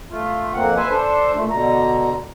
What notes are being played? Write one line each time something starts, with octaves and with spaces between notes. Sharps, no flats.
A3 F4
F2 A#3 C4 F#5
B4 C5 E5 G#5
D4 A4 C5
A#2 A3
B2 D3 A#5